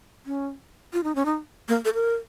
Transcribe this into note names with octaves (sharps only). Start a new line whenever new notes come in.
C#4
F4
D#4
C#4
D#4
A#3
A4
A#4